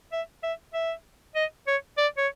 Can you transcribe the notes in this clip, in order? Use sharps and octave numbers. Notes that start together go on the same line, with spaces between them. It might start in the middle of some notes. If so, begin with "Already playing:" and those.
E5
E5
E5
D#5
C#5
D5
C#5